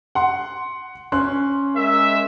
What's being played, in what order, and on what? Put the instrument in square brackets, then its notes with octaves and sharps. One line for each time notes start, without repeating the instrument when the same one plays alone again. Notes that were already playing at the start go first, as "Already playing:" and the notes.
[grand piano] F#5 C6
C#4 C6 F#6
[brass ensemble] G#3 A#4 E5